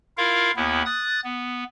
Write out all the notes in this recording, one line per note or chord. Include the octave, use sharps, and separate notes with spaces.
E4 F4 A#4 F5
D#2 B3 E4
D#6 F#6 A6
B3